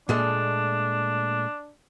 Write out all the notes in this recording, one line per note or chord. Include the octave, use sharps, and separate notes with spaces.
A#2 G#3 A3 D4